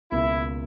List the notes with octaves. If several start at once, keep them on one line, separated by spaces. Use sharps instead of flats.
C#2 B2 A#3 E4